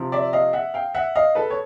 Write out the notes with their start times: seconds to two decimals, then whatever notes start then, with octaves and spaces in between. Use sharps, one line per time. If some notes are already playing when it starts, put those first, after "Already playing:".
Already playing: C3 F3
0.12 D5 E5
0.33 D#5 F5
0.53 E5 F#5
0.74 F5 G5
0.95 E5 F#5
1.15 D#5 F5
1.35 A4 B4
1.50 C#5